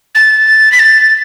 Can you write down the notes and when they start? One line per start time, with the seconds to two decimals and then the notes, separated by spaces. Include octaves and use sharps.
0.15 A6
0.72 B6
0.79 A6